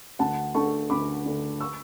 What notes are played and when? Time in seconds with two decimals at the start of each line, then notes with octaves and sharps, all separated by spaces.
0.19 D2 F#5 A5
0.55 D3 A3 A5 C#6
0.90 D2 B5 D6
1.25 D3 A3
1.61 C#6 E6